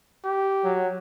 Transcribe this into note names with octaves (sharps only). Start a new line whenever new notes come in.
G4
F#3